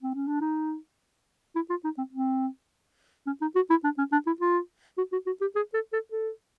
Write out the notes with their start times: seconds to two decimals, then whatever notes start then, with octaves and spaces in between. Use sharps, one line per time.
0.02 C4
0.15 C#4
0.28 D4
0.41 D#4
1.56 E4
1.70 F4
1.84 D#4
1.98 C4
2.13 C4
3.27 C#4
3.42 D#4
3.56 F#4
3.70 E4
3.84 D4
3.98 C#4
4.12 D4
4.27 E4
4.41 F4
4.98 F#4
5.12 F#4
5.27 F#4
5.41 G4
5.56 G#4
5.74 A4
5.93 A4
6.12 A4